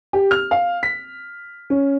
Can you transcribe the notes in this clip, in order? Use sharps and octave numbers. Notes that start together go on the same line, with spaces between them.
G4
F6
F5
B6
C#4